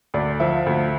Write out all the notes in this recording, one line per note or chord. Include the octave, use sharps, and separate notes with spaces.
D2 D5
F3 E5
D2